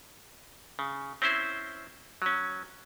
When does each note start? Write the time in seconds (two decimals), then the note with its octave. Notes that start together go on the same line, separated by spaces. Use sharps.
0.79 C#3
1.22 C4 C#4 E4 C5
2.22 F#3 C#4